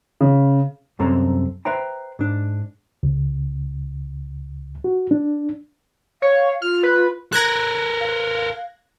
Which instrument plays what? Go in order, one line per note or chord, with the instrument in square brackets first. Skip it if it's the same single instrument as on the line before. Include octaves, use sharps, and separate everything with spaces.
[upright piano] C#3
[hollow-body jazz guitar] C2 F#2 C4 A4 C5 A#5
B4 C5 E5 G5 A#5
G#2 D4
[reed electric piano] C#2
F#4
D4
[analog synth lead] C#5 [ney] F5
[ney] F4 [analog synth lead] F6
[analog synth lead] B4
[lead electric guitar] A4 A#4 [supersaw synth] F#6 G#6 A#6
[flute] F5